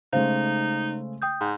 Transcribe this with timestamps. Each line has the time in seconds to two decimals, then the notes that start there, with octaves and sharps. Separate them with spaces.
0.13 C#3 G#3 A3 D#4 C5 F5
1.22 G5 D#6 G6
1.41 G#2